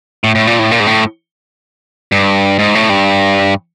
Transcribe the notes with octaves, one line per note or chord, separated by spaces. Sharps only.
A2
A2
A#2
A2
A#2
G#2
A2
G2
G#2
A2
G2